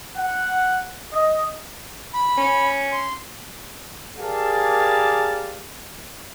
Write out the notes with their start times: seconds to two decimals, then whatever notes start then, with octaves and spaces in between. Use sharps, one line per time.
0.15 F#5
1.13 D#5
2.14 B5
2.38 C#4
2.92 C6
4.19 G4 G#4 A#4 D5 F5 A5